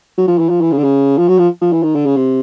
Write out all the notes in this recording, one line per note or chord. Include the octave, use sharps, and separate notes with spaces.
F#3
F3
E3
F3
E3
C#3
D3
C#3
F3
F#3
F3
F3
E3
D#3
D3
C#3
C3